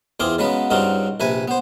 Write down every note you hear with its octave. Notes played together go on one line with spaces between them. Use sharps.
E2 C4 F4 G#4 D6
C#3 F#3 G#3 B3 B4
G2 C#3 C4 D#4 F4 F#4
A#1 C3 B4 G#5
B3 C5